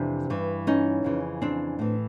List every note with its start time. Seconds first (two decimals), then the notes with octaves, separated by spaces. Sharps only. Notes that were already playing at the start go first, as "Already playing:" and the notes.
Already playing: F2 C3 E3 C4 D4
0.30 G2 E3
0.67 C#4 D#4
1.04 F2 C#3 E3
1.42 C4 D4
1.79 A2 E3